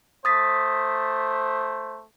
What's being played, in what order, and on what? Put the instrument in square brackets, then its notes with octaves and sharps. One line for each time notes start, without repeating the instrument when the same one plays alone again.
[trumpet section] A3 C5 [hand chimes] D#6 A6 B6